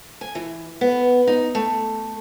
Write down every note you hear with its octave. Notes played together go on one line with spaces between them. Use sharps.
G#5
E3
B3
D#4
A3